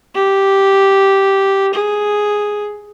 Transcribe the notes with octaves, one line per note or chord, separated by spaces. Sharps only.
G4
G#4